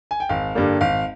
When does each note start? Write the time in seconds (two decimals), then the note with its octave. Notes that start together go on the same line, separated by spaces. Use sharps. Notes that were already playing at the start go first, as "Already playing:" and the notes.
0.11 G#5
0.20 G5
0.29 G#1 F5
0.55 G2 D3 G3 A#3
0.81 G#1 F5